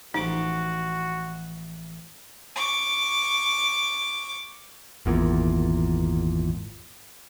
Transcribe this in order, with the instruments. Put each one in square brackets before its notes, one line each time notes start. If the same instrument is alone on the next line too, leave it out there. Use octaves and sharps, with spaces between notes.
[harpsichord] A1 F3 D6 [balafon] D#4 [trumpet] F#4
[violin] C#6 D6
[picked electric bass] G#1 E2 A#2